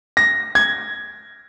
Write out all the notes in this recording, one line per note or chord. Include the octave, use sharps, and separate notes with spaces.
A#6
G#6